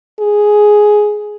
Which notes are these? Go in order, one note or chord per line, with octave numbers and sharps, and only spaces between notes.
G#4